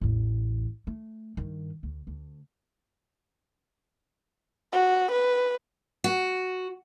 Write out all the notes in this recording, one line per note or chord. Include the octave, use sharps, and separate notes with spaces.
A1 E2
A3
G2 D#3
D2
D2
F#4
B4
F#4